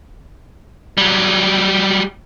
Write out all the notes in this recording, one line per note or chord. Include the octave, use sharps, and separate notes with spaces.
F#3 G3